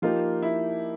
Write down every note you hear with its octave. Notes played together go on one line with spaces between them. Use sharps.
F3 A#3 D#4 F4 G4
E4